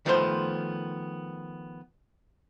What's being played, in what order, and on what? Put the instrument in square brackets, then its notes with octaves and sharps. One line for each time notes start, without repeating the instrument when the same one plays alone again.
[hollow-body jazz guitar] D#3 F3 A3 B3 A4 C5